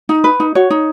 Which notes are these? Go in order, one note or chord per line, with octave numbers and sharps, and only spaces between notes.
D#4
B4
D#4
F#4 C#5
D#4